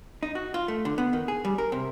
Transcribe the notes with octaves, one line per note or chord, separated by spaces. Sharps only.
D#4
F#4
F4
A3
D3
B3
D#3
G#4
G3
A#4
C3